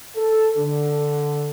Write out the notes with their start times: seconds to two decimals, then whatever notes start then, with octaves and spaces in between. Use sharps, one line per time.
0.16 A4
0.57 D3